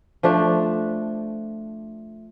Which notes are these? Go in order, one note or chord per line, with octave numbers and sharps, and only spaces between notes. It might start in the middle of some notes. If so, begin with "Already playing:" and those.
F3 A3 D4